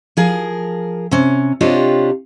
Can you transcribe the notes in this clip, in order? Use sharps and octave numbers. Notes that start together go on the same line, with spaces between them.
F3 G#4 A#4
C3 C#4
C3 D4 F4 G4 C#5 D#5